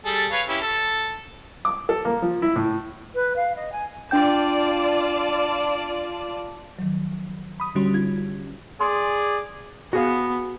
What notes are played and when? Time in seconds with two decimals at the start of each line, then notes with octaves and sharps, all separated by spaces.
0.06 G3 G#4 A4
0.32 B4 C#5 F5
0.49 C#4 E4 G4
0.61 A4
1.65 D6
1.89 A4
2.05 A#3
2.22 F3
2.42 E4
2.56 A2
3.14 B4
3.36 F5
3.55 D#5
3.72 G#5
4.11 D4 F4 D5 G5 A5 G6
6.79 D#3 F3 F#3
7.60 B5 D#6
7.75 D3 G3 C#4 F#4 C6
7.94 D#4 F4 G#6
8.81 G#4 D5 C6
9.93 B3 F#4 G#4 F5